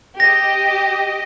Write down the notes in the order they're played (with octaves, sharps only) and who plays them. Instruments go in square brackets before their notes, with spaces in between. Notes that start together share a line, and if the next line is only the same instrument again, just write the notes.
[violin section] G4 D#5 [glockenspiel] A#6